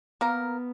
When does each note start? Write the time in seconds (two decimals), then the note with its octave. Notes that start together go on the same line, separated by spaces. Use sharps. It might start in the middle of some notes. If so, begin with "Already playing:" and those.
0.21 A#3 B3 A#4